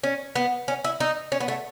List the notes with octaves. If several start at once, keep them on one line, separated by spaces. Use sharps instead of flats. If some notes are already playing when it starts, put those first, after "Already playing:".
C#4
B3
C#4
E4
D#4
C#4
B3
A3